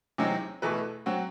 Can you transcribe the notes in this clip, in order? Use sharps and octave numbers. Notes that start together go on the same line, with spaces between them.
E2 C3 F#3 C4 D#4
E2 B2 A3 E4 B4
F#3 C4 F#4